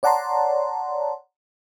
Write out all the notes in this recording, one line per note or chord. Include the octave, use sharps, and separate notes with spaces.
C#5 D5 F#5 A5 A#5 C6